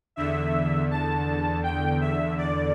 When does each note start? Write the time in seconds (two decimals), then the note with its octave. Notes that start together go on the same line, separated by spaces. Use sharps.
0.16 E2 D3 E5
0.90 A5
1.63 G5
2.01 E5
2.38 D5